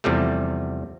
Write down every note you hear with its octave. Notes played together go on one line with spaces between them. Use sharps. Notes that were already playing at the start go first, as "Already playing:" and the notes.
E2 C3 F3 G3 A3